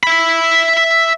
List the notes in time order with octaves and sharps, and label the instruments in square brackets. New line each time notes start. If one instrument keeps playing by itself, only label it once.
[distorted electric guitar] E5 B5